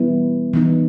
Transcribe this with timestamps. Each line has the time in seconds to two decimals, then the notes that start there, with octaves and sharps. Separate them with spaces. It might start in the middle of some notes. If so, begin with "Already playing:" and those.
Already playing: E3 G3 B3 E4
0.53 E3 B3 D#4